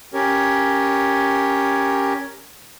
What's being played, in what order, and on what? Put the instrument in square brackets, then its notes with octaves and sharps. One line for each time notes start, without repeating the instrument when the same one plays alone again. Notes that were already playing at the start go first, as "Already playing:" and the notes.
[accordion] C#4 G4 A#4 C#5